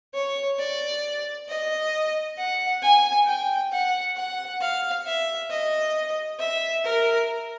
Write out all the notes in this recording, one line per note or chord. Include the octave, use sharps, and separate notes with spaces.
C#5
D5
D#5
F#5
G#5
G5
F#5
F#5
F5
E5
D#5
E5
A#4